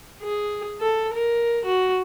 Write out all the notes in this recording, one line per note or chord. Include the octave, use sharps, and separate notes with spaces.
G#4
A4
A#4
F#4